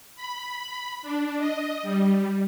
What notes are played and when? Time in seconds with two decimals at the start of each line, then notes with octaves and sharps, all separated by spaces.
0.16 B5
1.02 D4
1.38 D#5
1.83 G3